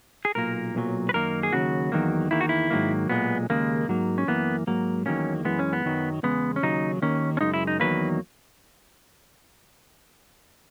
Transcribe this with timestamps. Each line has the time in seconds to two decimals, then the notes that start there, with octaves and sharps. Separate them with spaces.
0.25 G#4
0.35 B1 A#2 A#3 A#4
0.75 B1 A#2 F#3
1.09 B4
1.14 F#2 D#3 A#3 A#4
1.43 G#4
1.52 D#2 C#3 F#3 F#4
1.92 E2 D#3 F#3 A#3
2.31 E2 D#3 A#3 E4
2.41 F#4
2.49 E4
2.70 G#2 D#3 F#3 A#3
3.09 B1 A#2 G#3 B3
3.50 D#2 C#3 G#3 A#3
3.88 G#2 F#3 A#3
4.18 C#4
4.27 F#2 E3 A#3 B3
4.67 G#2 F#3 A#3
5.06 E2 D#3 F#3 A#3 C#4
5.45 F#2 E3 G#3 B3
5.59 C#4
5.73 B3
5.85 F#2 D#3 F#3
6.23 E2 C#3 G#3 B3
6.56 C#4
6.63 D#2 C#3 F#3 D#4
7.02 D#2 D#3 A#3 C#4
7.37 C#4
7.41 F#2 C#3 G#3 D#4
7.54 E4
7.67 D#4
7.80 E2 D#3 F#3 A#3 B4